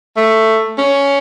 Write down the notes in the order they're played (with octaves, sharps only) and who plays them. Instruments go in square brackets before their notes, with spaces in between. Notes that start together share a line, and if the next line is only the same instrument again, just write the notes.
[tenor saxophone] A3
C#4